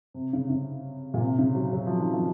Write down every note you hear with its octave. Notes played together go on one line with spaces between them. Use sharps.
C3
C#3
C#3
A#2
C3
C#3
F#3
F#3
F3
D#3
F3